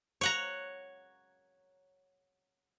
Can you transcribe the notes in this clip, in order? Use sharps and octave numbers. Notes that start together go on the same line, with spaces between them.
C#5 F#5 A#5